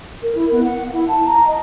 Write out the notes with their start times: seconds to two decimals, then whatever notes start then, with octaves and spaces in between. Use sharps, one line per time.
0.23 A#4
0.35 E4
0.52 B3
0.64 F#5
0.79 F#5
0.92 E4
1.08 A5
1.25 A#5
1.47 D#5